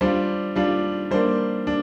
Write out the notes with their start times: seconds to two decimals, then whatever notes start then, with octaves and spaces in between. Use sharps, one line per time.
0.01 G3 D4 F4 C5
0.56 G3 D4 F4
1.11 G3 A#3 D4 C5
1.67 D4